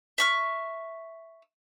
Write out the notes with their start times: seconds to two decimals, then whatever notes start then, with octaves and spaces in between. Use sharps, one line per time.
0.18 E5 C#6 F6